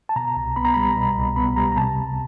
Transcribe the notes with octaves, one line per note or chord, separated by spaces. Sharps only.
A5
B2 A#5
C2
B3 B5
A#5
G3 B5
B2
C2
B3 B5
G3 A#5
A#5
C3 A5
C#2